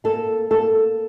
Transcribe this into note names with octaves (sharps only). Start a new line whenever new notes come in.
A#3 A4
A#3 A4